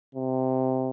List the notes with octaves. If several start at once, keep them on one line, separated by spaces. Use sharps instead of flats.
C3